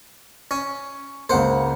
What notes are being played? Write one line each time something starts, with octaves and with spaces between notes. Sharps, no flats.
C#4
C#2 A#3 C5 F#5